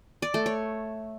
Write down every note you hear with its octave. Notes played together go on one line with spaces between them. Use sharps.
D5
A3
C#5